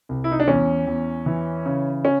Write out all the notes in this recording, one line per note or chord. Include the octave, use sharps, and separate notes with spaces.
C2
E4
D#4
D4
E2 C#4
E2
E3
C#3
C#4